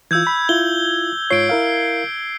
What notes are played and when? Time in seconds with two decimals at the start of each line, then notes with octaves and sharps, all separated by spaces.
0.11 E3 F4 E6 G6 G#6
0.27 B5
0.49 E4 F4 G7
1.31 G#2 F4 C#5 C7 D7
1.49 E4 A#4 F5